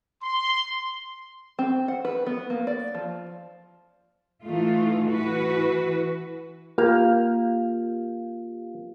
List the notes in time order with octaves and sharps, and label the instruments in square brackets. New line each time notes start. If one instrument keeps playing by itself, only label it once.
[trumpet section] C6
[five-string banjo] C4
F#5
B4
B3
A#3
D5
F3
[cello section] E3 A3 D#4 F4
E3 F#4 B4
[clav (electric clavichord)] A#3 [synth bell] F4 G4 F5